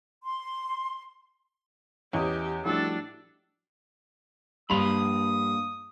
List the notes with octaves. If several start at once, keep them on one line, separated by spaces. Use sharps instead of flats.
C6
E2 C#4 G4 D#5 D#6
A2 F3 G3 D4 F#4 A4
G2 A#3 D4 B5 C6 D#6 F7